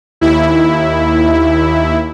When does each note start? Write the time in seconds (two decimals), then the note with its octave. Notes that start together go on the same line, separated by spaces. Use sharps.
0.21 D#2 E4